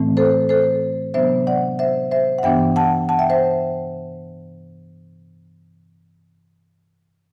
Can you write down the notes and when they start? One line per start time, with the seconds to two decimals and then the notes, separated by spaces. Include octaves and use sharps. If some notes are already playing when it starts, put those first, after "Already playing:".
Already playing: A2 E3 A3 C4
0.17 A4 C5
0.49 A4 C5
1.14 C3 F#3 B3 D4 C5 E5
1.47 D5 F#5
1.79 C5 E5
2.11 C5 E5
2.39 F#5
2.43 G2 E3 B3 D4 E5 G5
2.76 F#5 A5
3.09 F#5 A5
3.19 E5 G5
3.30 C5 E5